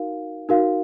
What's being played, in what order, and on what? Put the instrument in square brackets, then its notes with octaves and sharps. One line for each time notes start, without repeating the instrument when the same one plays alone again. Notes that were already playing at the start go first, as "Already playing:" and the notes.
Already playing: [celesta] D#4 F#4 A#4 F5
D#4 F#4 A#4 F5